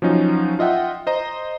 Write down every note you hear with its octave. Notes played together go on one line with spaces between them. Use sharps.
F3 F#3 C#4 D#4
F4 D#5 E5 F#5 G5
C5 D#5 A#5